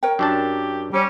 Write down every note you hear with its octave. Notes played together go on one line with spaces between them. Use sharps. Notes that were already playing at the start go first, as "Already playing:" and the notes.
A#4 C#5 G5
F#2 D4 G4 A5
G3 C#4